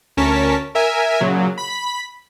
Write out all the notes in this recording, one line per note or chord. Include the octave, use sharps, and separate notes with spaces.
D2 C#4 A#4 A5 C#6 B6
A#4 E5 G#5
A#2 C#3 F#3
B5 B6